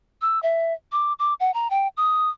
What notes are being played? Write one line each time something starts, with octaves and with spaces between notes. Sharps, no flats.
E6
E5
D6
D6
F#5
A#5
G5
D#6